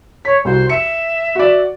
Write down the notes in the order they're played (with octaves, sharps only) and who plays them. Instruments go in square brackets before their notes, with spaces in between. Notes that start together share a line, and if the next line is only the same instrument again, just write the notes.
[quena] C#5 [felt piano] B6
[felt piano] C2 F#4 [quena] C5
[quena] E5 [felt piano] C#7
[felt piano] F#4 D5